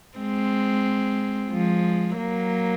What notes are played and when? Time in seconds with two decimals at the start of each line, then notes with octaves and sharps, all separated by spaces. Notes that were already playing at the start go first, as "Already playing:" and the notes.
0.18 G#3 C4
1.51 F3 G#3
2.17 F#3 A#3